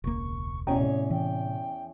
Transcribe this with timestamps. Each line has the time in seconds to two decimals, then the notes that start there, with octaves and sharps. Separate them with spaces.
0.04 E1 C#2 A#3 C#6
0.67 E2 B2 C#4 C#5 D#5 G5 A#5
0.80 A2 C3
1.11 E3 G5